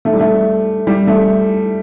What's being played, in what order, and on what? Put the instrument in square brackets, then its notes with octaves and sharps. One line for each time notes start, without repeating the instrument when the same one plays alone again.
[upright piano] A3
G3
A3
G3
A3